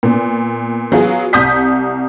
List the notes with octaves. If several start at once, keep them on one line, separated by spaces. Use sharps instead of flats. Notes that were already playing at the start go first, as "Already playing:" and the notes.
A#2 B3
F#3 B3 F4 F#4 G#4
C2 D#6 G6 B6